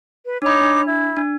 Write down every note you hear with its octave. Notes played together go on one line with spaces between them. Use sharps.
B4
D4 D#4 C#5 B5 D6
D4
E4
D4